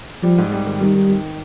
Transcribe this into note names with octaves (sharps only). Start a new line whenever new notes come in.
F3 G3
G#2
G3
D#3
D#3 G3
D#3
D#3